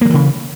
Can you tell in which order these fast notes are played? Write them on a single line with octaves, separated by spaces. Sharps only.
A#3 F3 E3 C#3